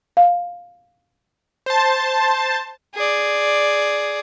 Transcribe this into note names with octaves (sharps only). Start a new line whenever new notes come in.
F5
C5 A5
G#4 D5